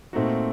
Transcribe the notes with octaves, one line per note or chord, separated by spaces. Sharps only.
A#2 A3 C4 D#4 F#4